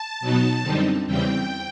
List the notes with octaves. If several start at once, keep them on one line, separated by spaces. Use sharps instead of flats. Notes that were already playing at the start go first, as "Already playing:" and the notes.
Already playing: A5
B2 F#3 B3 D#4
F#2 D3 G3 C4 D#4
E2 C#3 E3 G3 C4 G5